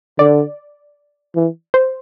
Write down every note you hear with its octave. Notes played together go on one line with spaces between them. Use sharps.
D3 D5
E3
C5